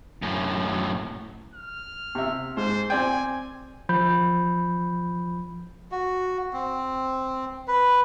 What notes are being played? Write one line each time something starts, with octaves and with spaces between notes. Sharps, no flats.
F#2 A2
F6
C3 E5
G#2 C5
C4 D5 G5 G#5
F3 B5 G6
F#4
C4
B4